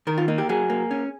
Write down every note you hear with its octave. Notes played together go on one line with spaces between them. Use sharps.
D#3 A#4
F4
A#3 D#4
G4
F#3 G#4
A#3
C#4